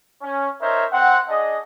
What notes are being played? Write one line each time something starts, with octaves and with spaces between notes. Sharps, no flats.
C#4
D#4 A#4 C5 C#5 E5
C4 F#5
D4 G#4 D#5